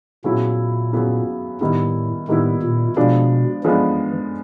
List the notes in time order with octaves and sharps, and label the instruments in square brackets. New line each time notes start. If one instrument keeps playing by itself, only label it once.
[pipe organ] A#2 [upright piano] C#3 F#3 B3 E4
[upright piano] C#3 F#3 B3 E4
[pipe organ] A2 [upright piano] D#3 G3 B3 E4
[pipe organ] A2 [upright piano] D#3 G3 B3 E4
[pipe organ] A#2
[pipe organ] B2 [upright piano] F3 G#3 B3 D4
[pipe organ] E3 [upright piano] F3 G#3 B3 D4